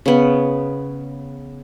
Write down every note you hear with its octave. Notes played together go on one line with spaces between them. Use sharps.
C#3 B3